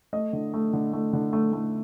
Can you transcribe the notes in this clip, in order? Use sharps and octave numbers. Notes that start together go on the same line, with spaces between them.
A3 D#5
D3
A3
D3
A3
D3
A3
A3